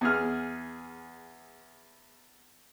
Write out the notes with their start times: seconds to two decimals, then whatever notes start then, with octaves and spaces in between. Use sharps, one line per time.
0.01 E2 G#4 F6